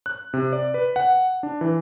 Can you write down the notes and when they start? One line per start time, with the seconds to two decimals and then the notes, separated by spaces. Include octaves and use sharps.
0.06 F#6
0.34 C3
0.53 D5
0.74 B4
0.96 F#5
1.43 D4
1.61 E3